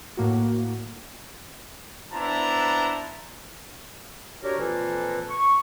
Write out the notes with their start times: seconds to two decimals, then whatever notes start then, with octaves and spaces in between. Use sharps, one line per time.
0.17 A2 A#3 F#4
2.13 B3 D4 E4 C5 A5 A#5
4.42 D4 F#4 G4 A#4 C#5
4.58 F2 A#2 E3 A#3 A4 B4
5.29 C#6